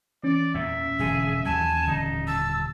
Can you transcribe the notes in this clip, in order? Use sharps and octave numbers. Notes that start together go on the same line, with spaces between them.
E3 C#4 D5
E2 A#2 E5
E1 F2 D3 G#4
D#2 F#3 G#5 A5
D#1 D3 D#4
A5 E6